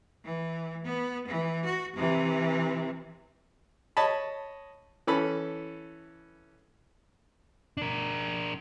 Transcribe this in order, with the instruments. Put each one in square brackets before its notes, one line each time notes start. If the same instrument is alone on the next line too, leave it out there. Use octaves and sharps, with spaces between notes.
[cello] E3
B3
E3
F#4
C3 E3
[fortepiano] C#5 D#5 A5 B5
E3 C#4 A4 B5
[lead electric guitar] D4 A#4